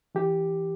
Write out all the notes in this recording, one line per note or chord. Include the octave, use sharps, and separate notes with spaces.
E3 G4